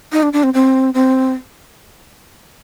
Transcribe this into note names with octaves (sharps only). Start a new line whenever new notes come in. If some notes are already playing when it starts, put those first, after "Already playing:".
D#4
D4
D4
C4
C4
C4